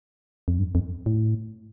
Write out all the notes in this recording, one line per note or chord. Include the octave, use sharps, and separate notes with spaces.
F2
G2
F2
A2